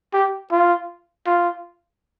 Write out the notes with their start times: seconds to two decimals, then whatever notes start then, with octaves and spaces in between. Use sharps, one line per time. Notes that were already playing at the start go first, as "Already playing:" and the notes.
0.13 G4
0.51 F4
1.27 F4